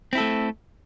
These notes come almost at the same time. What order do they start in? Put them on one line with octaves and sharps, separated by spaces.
C4 E4 A4 A3